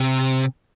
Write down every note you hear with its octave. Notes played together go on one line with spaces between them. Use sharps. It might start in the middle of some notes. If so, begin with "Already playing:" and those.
Already playing: C3